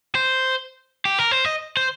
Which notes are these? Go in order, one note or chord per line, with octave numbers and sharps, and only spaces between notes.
C5
G4
A#4
C5
D#5
C5